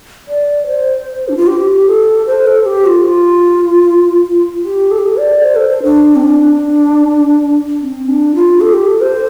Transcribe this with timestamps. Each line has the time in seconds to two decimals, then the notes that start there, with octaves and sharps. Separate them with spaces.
0.28 D5
0.67 C5
1.29 D4
1.37 F4
1.47 G4
1.87 A4
2.27 C5
2.47 A4
2.66 G4
2.86 F4
4.64 G4
4.91 A4
4.99 G4
5.06 A4
5.17 D5
5.44 C5
5.56 A4
5.69 C5
5.83 D4
6.16 C4
6.24 D4
7.82 C4
8.08 D4
8.35 F4
8.61 A4
8.74 G4
8.87 A4
9.01 C5